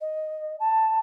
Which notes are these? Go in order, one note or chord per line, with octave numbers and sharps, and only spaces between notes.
D#5
A5